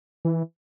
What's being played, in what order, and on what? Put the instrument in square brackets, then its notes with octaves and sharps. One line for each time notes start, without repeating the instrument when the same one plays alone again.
[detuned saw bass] E3